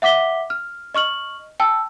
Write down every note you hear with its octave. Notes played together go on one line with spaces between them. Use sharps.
E5 F#5 D6 B6 G7
F6
D#5 C#6 F6 F#7
G5 A5 E6